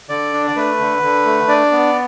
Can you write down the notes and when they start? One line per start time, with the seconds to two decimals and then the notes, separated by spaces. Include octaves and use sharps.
0.09 D3 D5
0.33 D4
0.47 D5
0.56 A3 B4
0.80 D3
1.02 D3
1.25 A3
1.48 D4 D5
1.72 B3